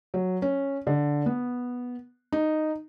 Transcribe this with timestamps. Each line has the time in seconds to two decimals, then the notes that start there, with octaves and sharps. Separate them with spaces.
0.14 F#3
0.42 C#4
0.87 D3
1.26 B3
2.32 D#4